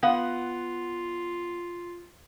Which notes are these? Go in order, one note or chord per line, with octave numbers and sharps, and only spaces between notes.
B3 F4 F5 F#5